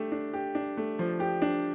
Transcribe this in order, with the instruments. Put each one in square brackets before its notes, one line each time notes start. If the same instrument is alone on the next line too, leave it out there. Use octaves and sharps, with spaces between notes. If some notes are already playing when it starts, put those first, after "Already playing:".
Already playing: [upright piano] A3 D4 G4
D4
G4
D4
A3
F3
G4
D4